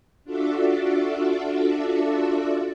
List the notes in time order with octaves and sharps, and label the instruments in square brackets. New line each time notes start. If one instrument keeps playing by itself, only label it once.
[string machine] D4 F4 F#4 A4 D5 E5